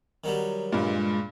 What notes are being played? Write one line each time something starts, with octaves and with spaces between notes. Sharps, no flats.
D#3 F#3 G3
G2 A#2 G#3